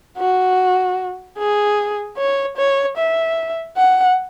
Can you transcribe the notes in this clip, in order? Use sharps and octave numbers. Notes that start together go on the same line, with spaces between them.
F#4
G#4
C#5
C#5
E5
F#5